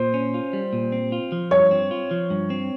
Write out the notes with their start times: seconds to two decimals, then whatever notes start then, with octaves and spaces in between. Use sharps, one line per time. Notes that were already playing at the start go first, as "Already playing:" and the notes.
Already playing: A#2 C5
0.14 C#4
0.34 F4
0.53 G3
0.73 A#2
0.92 C4
1.12 F4
1.32 F3
1.51 G2 C#5
1.71 C4
1.91 F4
2.11 F3
2.30 G2
2.50 C4